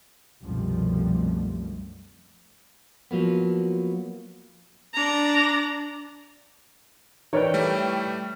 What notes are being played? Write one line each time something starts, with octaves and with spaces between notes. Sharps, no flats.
C2 F#2 B2 F3 G3 A3
F3 F#3 A#3 B3
D4 A#5
E3 D#4 A#4 B4 C#5 D5 G5
G3 A3